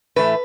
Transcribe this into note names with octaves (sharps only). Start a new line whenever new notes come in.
A2 E3 A3 B4